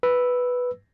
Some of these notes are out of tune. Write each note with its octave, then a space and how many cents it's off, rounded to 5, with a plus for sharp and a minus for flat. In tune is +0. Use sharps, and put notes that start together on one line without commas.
B4 +0 E6 +0